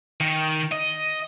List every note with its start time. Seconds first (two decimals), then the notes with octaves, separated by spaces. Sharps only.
0.20 D#3
0.71 D#5